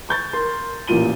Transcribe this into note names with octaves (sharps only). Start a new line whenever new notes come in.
C#6 G6 A6
A#4 C6
A1 A#2 A#3 F4 D#7 G7